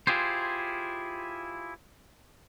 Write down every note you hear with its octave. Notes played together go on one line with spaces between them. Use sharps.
E4 F4 G4 G#4 C5